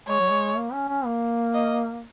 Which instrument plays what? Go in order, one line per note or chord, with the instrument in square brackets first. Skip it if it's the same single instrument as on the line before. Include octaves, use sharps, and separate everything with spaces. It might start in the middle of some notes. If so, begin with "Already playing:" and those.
[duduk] G#3 [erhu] C#5
[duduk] F#3
G#3
A#3
C#4
C#4
A#3
[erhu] D#5